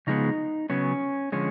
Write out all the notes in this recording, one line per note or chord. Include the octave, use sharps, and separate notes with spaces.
C#3 F3 G#3 B3 D#4
C#3 F#3 B3 C#4
D3 F3 G#3 C#4